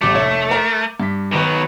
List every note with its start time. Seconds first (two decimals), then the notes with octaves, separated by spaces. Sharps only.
0.02 A1 G3 A3 D6
0.14 F1 C#5
0.51 A#4
1.00 G2 B6
1.33 B2 D#3 F#3 B4